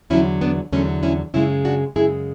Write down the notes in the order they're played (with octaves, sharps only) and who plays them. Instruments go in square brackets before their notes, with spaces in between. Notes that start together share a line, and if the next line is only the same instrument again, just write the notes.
[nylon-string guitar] E2 D3 F#3 C#4 E4
B3 D4
E2 D3 F#3 A3 C#4
C#4 E4
F#2 C#3 G#3 C#4 E4
D4 F#4
F#2 C#3 G#3 E4 G#4